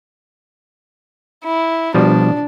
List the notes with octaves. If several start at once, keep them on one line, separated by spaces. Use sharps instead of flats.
E4
B2 F3 G3 D4